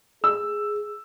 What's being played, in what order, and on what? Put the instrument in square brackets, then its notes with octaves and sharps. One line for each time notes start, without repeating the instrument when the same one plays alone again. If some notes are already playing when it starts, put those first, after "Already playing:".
[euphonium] G#4 [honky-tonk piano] E6